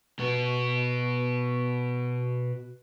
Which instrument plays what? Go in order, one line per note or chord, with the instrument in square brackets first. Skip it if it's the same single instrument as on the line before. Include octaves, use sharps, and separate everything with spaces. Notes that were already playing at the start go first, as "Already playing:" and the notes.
[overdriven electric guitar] B2 B3